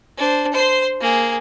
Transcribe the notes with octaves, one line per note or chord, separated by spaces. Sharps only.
D4 C5
C5 C6
A#3 G#4